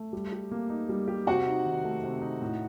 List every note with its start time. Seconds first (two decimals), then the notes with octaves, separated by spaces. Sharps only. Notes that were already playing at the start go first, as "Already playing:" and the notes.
Already playing: A3
0.13 G3
0.32 G4
0.52 A#3
0.70 D#4
0.89 G3
1.08 G4
1.27 C3 F#4 F#5
1.46 D#4
1.66 D#3
1.84 A3
2.04 C3
2.22 D#4
2.42 A2